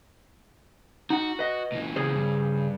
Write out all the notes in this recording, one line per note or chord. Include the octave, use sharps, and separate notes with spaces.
D#4 F#4 F#5
B4 D#5
A#2 E3
C#3 G#4 C5
G2